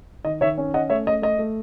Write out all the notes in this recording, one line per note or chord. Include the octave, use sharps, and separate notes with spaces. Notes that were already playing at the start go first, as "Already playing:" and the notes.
D#3 D#5
D#3 C#5 E5
C#4
C#4 D#5 F#5
A3 C#5 E5
A3 D#5
A3 D#5
A3